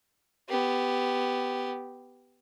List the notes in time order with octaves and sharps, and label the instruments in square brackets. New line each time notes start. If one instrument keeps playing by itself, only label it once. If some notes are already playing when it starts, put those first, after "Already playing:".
[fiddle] B3 G4